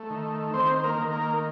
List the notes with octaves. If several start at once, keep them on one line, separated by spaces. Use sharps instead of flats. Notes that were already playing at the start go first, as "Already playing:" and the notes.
Already playing: A3
D#3
D#3 C4 C5
C5
A#3 A#4
D#3
A#3 A#4